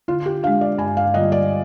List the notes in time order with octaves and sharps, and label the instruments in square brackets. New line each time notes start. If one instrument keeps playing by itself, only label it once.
[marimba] D3 [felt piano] F4
[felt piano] G4
[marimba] D4 [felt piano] F5
[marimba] G#3
[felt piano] D5
[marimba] G2 [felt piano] G#5
[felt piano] F5
[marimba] D3 G3 A#3 F4 [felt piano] D#5
[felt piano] D5